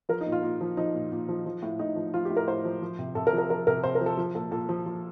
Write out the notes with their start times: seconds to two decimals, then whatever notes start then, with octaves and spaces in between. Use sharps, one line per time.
0.09 F3 A#4
0.21 D#4
0.26 A#2
0.32 F4
0.43 A#2
0.61 F3
0.77 F3 D#4
0.94 A#2
1.12 A#2
1.29 F3
1.46 F3
1.63 A2
1.79 A2 D#4
1.96 F3
2.14 F3 F4
2.25 G4
2.30 A2
2.37 A#4
2.47 A2 C5
2.65 F3
2.82 F3
2.99 C3
3.15 C3 A4
3.27 A#4
3.33 F3
3.38 A#4
3.50 F3 A#4
3.67 C3 A#4
3.84 C3 C5
3.95 A#4
4.01 F3
4.06 A4
4.17 F3
4.35 A#2 A4
4.51 A#2 A4
4.69 F3
4.86 F3